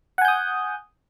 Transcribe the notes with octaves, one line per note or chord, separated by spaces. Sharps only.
F#5 G#5 D#6 G6